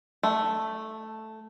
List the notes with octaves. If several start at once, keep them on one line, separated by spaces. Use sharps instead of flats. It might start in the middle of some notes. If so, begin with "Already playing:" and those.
A3